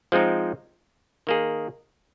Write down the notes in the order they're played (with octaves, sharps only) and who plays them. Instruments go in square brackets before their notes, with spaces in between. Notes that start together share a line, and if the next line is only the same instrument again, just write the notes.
[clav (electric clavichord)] F3 G#3 C4 D#4
D#3 A#3 D#4 G#4